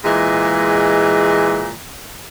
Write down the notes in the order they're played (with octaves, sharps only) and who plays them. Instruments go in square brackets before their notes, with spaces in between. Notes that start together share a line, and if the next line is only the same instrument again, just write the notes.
[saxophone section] A#2 E3 G#3